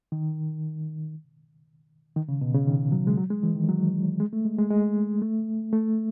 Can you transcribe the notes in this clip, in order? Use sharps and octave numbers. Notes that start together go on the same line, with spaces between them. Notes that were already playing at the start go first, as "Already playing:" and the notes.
D#3
D#3
C#3
B2
C#3
D#3
F#3
G#3
F#3
G#3
E3
D#3
F#3
G#3
A3
G#3
G#3
G#3
A3
A3